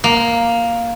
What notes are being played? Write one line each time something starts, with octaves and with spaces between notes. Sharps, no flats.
A#3